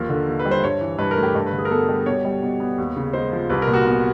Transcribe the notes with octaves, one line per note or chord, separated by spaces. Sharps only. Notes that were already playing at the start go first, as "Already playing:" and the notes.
Already playing: D#2 F3 A#4
D3
D#2
B4
G3
C5
G2 C#5
E3
G2 B4
A#4
A3
G4
G2
B4
D3
G#4
A#4
B3 A4
G3
B2 C#5
G3
B2
B3
D#2
C#3
G#3 C5
F3
C2 B4
A#4
A#2
F#4
B3